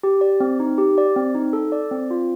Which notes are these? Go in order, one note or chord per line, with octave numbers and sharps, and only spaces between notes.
G4
D5
C4
D#4
G4
D5
C4
D#4
A4
D5
C4
F4